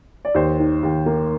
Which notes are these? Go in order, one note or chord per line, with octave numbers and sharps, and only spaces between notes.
D5
D#2 C5
D#3
D#2
A#3